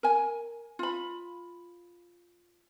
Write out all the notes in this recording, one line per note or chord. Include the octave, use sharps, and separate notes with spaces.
A#4 G#5
F4 B5